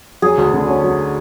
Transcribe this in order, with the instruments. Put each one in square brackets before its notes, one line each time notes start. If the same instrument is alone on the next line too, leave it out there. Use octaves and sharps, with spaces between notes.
[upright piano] F#3 [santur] G#4
[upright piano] D2
D3
C#4
F#3